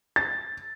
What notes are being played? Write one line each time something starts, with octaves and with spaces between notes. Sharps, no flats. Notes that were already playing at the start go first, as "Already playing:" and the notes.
A6